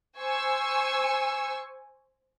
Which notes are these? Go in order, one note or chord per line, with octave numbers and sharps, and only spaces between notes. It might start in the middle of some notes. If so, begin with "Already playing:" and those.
C5 G#5 C#6 E6